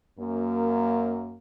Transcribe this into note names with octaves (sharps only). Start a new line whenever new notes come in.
F#2 A#3